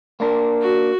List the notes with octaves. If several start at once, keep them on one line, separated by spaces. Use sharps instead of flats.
A#3 D4 A#4
F#4